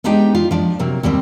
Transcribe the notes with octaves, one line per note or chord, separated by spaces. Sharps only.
G#3 B3 D4 D#4 G4 G5
F4
F3 D4
C3 F#3 A#3
D#2 G3 A#3 C4